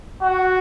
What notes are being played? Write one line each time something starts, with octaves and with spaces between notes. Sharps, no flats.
F#4